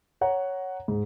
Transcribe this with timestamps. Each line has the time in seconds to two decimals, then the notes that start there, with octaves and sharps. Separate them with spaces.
0.21 C#5 F#5 A#5
0.88 G#2